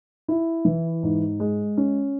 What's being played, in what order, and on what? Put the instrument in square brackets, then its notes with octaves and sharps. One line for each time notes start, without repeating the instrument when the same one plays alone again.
[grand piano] E4
E3
G#2
G#3
C#4